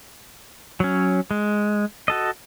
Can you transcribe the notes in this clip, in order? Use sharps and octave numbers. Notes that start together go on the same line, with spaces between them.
F#3 C#4
G#3
F#4 A4 D#5